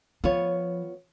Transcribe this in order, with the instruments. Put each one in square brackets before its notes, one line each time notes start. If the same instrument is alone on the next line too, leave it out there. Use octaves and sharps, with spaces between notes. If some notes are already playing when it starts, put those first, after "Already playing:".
[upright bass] F3 [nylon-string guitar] B3 F4 C#5